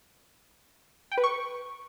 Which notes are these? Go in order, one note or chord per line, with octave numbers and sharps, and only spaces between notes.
G5
B4
C#6